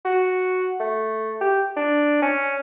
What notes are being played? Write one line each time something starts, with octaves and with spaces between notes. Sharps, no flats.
F#4
A3
G4
D4
C#4